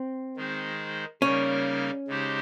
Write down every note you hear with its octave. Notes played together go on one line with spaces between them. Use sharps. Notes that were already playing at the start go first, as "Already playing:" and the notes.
Already playing: C4
D#3 G#3 D#4 G#4 C5
C#3 G3 A#3 C#4 D#4 A#4
C#3 G#3 D#4 G4 C5